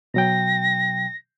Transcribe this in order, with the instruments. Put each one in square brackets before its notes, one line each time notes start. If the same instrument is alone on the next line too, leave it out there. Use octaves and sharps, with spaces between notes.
[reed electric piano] B2 F#3 G5 [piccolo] A#6